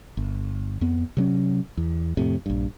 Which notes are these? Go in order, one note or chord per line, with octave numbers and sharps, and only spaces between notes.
G1
F2 B3
C3 F#3 C#4
E2
F2 A2 C3
A#1 G2